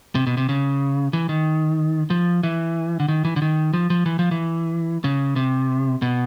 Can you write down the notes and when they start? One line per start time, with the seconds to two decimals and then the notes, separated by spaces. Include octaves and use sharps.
0.15 C3
0.27 B2
0.37 C3
0.49 C#3
1.13 E3
1.29 D#3
2.10 F3
2.43 E3
3.00 D3
3.08 D#3
3.25 E3
3.36 D3
3.42 D#3
3.73 F3
3.90 F3
4.06 E3
4.19 F3
4.31 E3
5.04 C#3
5.36 C3
6.02 B2